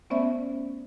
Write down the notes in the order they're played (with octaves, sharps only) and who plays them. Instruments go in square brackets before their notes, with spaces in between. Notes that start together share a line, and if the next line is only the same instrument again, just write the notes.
[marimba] A3 B3 C#4 C5 D5 E5